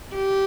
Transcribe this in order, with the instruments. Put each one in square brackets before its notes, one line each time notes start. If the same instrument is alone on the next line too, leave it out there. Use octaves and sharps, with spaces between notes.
[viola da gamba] G4